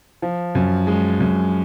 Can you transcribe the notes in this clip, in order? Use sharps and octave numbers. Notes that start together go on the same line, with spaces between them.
F3
F#2
G#3
F#2